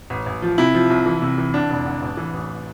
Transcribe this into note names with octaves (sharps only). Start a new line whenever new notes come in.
A1
A1
F3
C3 E4
F3
C2
E3
C3
E3
D3 D4
F1
D3
A1
E3
A1